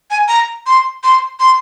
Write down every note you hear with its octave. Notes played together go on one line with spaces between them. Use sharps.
G#5
A#5
C6
C6
C6